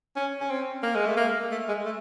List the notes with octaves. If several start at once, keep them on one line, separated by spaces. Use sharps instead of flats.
C#4
C#4
C4
A#3
G#3
A3
A#3
A3
G#3
A3